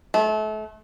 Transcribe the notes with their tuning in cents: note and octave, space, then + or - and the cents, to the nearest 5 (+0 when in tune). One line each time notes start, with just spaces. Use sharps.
A3 -35